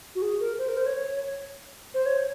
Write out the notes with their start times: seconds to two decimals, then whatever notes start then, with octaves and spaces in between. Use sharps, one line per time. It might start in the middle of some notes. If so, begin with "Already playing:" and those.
0.15 F#4
0.22 G#4
0.40 A#4
0.58 C5
0.68 A#4
0.77 C5
0.86 C#5
1.94 C5
2.06 C#5